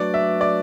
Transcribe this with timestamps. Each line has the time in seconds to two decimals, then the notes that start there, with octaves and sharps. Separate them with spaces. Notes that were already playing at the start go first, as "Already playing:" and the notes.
Already playing: F#3 A3 D4 F#4 B4 D5
0.14 E5
0.41 D5